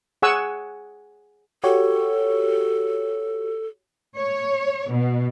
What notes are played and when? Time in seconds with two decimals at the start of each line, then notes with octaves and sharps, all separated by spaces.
0.22 G#4 F#5 G#5 C#6 E6
1.64 F#4 G4 A4 C#5
4.17 C#5
4.91 B2